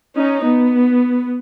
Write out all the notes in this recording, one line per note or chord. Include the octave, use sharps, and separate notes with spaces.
C#4 D#4
B3